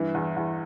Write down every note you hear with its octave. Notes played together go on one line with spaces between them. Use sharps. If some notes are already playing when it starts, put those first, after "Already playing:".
Already playing: G2 E3
E2
E2